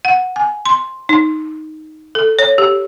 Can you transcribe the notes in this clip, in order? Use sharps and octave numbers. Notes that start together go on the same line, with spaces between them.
F#5
G#5
C6
D#4
A4
C#5
G4